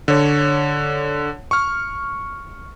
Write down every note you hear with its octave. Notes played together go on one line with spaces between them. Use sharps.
D3 C#5
C#6 F6